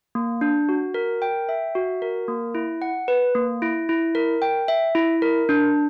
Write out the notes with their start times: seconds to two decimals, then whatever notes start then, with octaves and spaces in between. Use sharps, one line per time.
0.15 A#3
0.41 D4
0.69 F#4
0.94 A#4
1.22 G5
1.49 E5
1.75 F#4
2.02 A#4
2.28 A#3
2.55 E4
2.82 F#5
3.08 B4
3.35 A#3
3.62 E4
3.89 E4
4.15 A#4
4.42 G5
4.68 E5
4.95 E4
5.22 A#4
5.49 D4